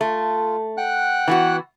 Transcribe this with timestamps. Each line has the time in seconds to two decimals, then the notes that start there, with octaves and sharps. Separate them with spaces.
0.01 A3 F4
0.77 F#5 G5 F#6
1.28 E3 B3 F#4